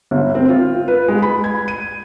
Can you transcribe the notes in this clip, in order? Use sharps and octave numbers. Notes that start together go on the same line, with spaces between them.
G1
C4
F4
B4
G#3
B5
G#6
D#7